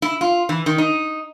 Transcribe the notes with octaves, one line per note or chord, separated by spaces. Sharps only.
E4
F4
E3
D#3
D#4